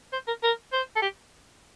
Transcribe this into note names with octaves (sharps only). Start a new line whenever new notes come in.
C5
A#4
A#4
C5
A4
G4